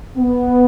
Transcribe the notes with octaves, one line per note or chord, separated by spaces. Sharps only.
B3